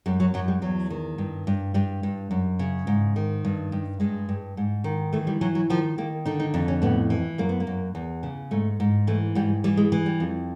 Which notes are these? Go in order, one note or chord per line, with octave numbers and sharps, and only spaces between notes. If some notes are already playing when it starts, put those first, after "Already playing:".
F#2 G3
F#3
F#2 F#3
G3
E2 F#3
D#3
G2
G2
G2 G3
G2
F#2
C#3
G#2
D#3
G2
G2
G2 G#3
G2
G#2
D#3
E3 A3
G3
E3 F#3
F#3
D#3 F3
D#3 A#3
D3 D#4
D#4
F2 D4
C#4
A2 B3
E3
F#2 A#3
B3
A#3
F#2
E2
C#3
G#2 A3
G#2
E3 A3
G#2 G3
E3 G3
G#3
E3 G#3
G3
F2